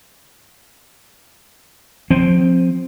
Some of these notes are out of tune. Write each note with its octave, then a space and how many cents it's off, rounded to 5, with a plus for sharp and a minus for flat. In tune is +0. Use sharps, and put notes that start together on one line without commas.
F3 +20 C4 +0